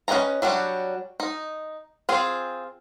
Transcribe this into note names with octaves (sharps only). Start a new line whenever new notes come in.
C#4 B4 D#5 G#5 A#5
F#3 G3 D4 F#4
D#4
C4 F4 G#4